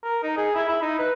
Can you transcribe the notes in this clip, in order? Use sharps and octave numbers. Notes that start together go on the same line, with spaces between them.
A#4
D#4
G#4
E4
E4
D#4
B4